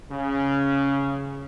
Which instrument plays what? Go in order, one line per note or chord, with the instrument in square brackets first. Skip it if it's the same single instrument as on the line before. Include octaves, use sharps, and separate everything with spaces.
[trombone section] C#3